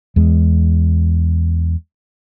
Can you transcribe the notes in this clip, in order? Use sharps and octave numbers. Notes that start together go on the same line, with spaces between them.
E2 G#3